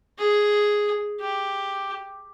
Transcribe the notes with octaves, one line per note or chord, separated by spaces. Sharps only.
G#4
G4